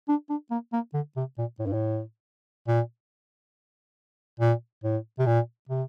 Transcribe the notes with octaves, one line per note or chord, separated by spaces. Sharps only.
D4
D4
A#3
A#3
D3
C3
A#2
A2
G2
A2
A#2
A#2
A2
C3
A#2
C3